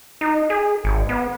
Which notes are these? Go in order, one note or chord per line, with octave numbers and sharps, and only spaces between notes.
D#4
G#4
G#1
B3